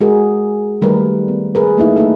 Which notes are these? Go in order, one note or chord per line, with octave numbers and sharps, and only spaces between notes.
G#3 F#4 G#4 A#4
D#3 G3 A3 A#4 B4
B3
G#4 A#4 B4
A3 A#3 D#4 E4
A3 A#3 D#4 A4